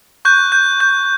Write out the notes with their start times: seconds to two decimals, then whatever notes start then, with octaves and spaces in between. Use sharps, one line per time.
0.25 C#6 F#6 G6
0.52 G6
0.80 G6